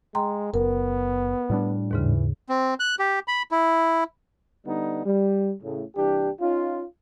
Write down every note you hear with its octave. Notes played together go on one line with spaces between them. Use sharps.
G#3 G5 A#5 C6
F#1 B3 A#4
A2 G3 D4
D#2 G#2 C#3 E3
C4
F#6
G4
B5
E4
D3 G3 B3 D4 D#4
G3
A2 C#3
C2 E3 D4 G4
C#4 D#4 F4